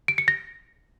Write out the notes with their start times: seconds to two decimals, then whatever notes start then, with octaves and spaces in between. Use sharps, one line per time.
0.08 D7
0.18 C#7
0.28 A#6